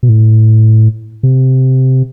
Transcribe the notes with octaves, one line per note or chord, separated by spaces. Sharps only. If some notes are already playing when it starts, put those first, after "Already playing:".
B2
A2
C3